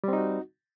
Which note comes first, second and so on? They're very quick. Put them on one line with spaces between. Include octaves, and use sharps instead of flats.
G3 C4 D#4 F#4